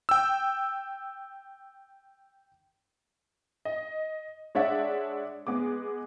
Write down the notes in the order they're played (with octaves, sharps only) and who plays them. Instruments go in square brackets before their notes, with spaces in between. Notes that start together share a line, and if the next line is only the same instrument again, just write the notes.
[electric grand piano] G5 E6
[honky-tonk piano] D#5
G#3 D4 C#5 D5 E5 F#5
G#3 B3 G#4 D6